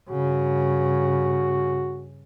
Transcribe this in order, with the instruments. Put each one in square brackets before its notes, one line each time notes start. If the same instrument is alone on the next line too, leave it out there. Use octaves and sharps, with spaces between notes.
[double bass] G2 C#3 [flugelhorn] F#4